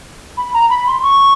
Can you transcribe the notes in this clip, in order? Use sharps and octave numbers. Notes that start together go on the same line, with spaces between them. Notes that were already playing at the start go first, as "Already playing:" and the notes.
B5
A#5
B5
C6
C#6